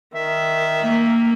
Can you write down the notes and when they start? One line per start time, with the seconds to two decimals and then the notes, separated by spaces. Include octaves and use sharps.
0.15 D#3 E5
0.82 A#3